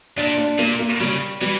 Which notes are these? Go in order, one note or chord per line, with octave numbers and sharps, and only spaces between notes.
A#2 D4
D4
A#2 A#3
A#3
C#3 G3
E3 G3